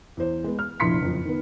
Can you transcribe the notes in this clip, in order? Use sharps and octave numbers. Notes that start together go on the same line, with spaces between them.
E2 C5
G#3 B3
F6
F1 A#1 E4 C6 B6 C#7
F#1 F2
D#3 B3